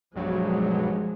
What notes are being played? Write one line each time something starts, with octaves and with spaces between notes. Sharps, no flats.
B1 G2 F3 F#3 G#3